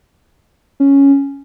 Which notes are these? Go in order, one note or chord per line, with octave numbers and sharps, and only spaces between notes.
C#4